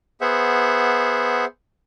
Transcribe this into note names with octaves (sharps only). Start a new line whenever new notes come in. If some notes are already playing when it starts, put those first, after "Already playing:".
B3 G#4 C5 E5 F#5